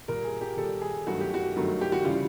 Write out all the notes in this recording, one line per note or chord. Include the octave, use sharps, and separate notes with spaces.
A#2 G3 A#4
G#4
G4
A#2 G3 A4
G#4
G2 D#3 F#3 A3 F#4
G4
F#4
G2 D#3 F#3 A3
G4
F#4
C#3 E3 G3 F4